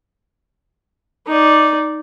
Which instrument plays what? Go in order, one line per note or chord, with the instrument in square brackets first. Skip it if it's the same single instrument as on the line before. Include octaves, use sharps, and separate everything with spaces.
[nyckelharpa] D#4 D5